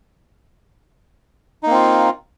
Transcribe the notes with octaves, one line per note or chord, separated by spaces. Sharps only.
A#3 C4 D#4 F4